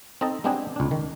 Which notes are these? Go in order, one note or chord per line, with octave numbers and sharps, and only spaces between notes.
C4 D#4 A4 D#5 A5
G#3 B3 C4 D4 G4 G#4
C#2 D4
D#3